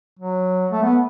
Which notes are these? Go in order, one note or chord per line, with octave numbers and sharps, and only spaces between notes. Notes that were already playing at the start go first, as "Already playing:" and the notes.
F#3
A3
B3